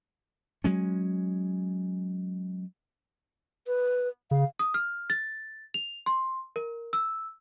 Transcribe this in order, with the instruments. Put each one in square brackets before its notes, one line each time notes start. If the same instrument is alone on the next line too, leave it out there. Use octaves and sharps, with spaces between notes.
[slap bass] F#3 G#3 C#4
[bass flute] B4
[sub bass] C#3 [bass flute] F5
[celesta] D#6
F6
A6
F7
C6
A#4
E6